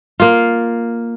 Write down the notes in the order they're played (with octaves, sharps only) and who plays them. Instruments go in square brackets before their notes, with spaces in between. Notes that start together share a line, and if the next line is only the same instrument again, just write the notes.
[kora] A#3 F4